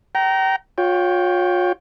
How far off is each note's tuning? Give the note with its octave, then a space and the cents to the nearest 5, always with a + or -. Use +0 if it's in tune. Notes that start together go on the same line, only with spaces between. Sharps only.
G5 -35 A#5 +0
F4 +40 C#5 +0 G5 +0